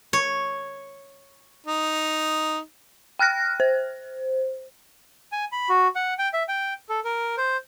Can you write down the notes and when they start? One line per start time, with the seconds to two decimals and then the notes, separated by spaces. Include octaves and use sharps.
0.13 C#5
1.67 D#4
3.19 G5 F6 F#6 A#6
3.60 C5
5.32 G#5
5.52 B5
5.69 F#4
5.96 F#5
6.19 G5
6.33 E5
6.49 G5
6.89 A4
7.04 A#4
7.37 C5